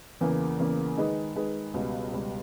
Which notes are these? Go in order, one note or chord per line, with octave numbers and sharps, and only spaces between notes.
E2 C#3 E3 A#3
E2 C#3 E3 A#3
D#3 G#3 D#4 G#4 B4
D#3 G#3 D#4 G#4 B4
C#2 B2 G3
C#2 B2 G3